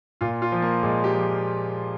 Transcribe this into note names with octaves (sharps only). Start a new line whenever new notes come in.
A#2 F4
F4
F3
A#3
A#2 G#3
G4
F3